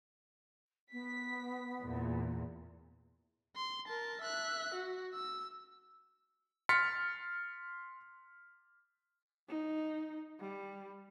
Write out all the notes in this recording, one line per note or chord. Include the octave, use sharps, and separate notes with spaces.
B3 B6
E2 A#2
C6
A#4 A5
E5 F#6
F#4
E6
C6 F6 A6 B6 C#7
D#4
G3